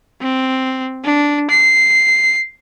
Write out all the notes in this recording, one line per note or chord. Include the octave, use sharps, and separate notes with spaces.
C4
D4
C7